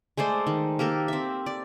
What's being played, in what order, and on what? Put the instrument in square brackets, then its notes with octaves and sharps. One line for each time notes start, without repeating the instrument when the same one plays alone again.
[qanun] G#3 A3 C5 D5
D#3
A#3 G4 A4 A#4
C4 E5
D5